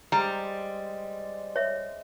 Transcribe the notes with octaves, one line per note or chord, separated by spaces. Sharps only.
G3 G#3 C5 A#5
C#5 E5